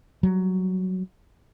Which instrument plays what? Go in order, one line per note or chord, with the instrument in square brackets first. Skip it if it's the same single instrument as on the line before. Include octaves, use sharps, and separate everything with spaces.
[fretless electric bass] F#3 G3